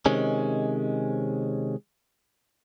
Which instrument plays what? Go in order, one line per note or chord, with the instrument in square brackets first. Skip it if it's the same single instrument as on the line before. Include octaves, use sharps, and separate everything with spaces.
[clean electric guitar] C3 D#3 G#3 C#4